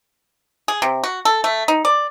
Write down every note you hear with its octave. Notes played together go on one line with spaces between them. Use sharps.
G#4
C3
F#4
A4
A3
D#4
D5